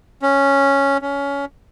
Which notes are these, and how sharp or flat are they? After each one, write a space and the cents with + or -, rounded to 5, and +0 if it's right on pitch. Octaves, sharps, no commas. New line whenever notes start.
C#4 +0
C#4 +20